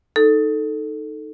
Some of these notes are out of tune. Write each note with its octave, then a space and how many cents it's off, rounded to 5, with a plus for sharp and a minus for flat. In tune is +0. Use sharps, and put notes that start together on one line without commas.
D#4 +0 A4 +0